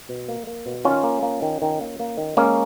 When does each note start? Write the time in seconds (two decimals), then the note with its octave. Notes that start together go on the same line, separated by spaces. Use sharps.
0.09 B2
0.29 A#3
0.47 A#3
0.66 B2
0.85 D#3 C#4 F4
1.04 A#3
1.23 A#3
1.42 D#3
1.62 D#3
1.81 A#3
2.00 A#3
2.18 D#3
2.37 G#3 A#3 C#4